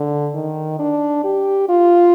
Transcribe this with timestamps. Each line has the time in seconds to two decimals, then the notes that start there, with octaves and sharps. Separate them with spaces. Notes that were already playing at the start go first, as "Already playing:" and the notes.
Already playing: D3
0.35 D#3
0.79 D4
1.24 G4
1.69 F4